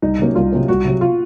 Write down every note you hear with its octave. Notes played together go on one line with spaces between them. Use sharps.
C2 D#4
C3 F#3 A#3 C#4
C2 F4
C3 F#3 A#3 C#4
C2 F#4
C3 F#3
F4